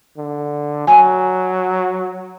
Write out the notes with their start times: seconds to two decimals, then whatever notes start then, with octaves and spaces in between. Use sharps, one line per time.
0.17 D3
0.87 F#3 G#5